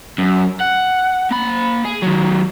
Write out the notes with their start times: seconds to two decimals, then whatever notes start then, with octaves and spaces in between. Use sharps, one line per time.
0.18 F#2
0.61 F#5
1.31 A#3 B5
1.85 G#4
2.03 D#3 F#3